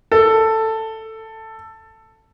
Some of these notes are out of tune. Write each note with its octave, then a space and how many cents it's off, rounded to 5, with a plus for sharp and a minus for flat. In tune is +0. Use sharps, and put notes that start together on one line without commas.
A4 +10